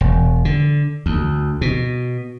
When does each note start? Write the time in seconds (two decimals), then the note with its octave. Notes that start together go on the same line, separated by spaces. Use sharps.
0.01 E1
0.45 D3
1.06 D2
1.61 B2